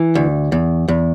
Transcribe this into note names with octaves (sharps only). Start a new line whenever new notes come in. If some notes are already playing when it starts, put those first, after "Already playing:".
Already playing: E3
D2
E2
E2